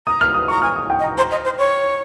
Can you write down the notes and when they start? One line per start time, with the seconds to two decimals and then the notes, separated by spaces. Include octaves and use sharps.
0.07 A#5 D#6
0.21 F6
0.34 D#6
0.48 A#5 C#6
0.62 G#5 F6
0.76 D#6
0.90 G5
0.99 D#5
1.04 A#5
1.18 C5 A#5
1.31 D#5
1.45 C5
1.58 C#5